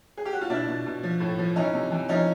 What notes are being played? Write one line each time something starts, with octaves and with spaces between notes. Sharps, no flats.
G#4
G4
F#4
F4
B2 D4 E4
B2
B2
F3
A2
F3
E3 C#4 D#4
C3
E3
F3 C#4 D#4